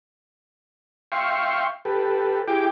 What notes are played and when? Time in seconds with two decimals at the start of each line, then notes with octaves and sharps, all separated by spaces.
1.12 E5 F5 G5 C6 C#6
1.85 G4 A4 B4
2.48 E4 G4 G#4 G5 D6